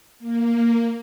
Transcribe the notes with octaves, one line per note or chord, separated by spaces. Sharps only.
A#3